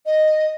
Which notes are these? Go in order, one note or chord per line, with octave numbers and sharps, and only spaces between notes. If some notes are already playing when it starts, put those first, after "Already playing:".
D#5